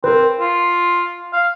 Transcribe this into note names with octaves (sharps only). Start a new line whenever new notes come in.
C4 A#4 B4
F4
F5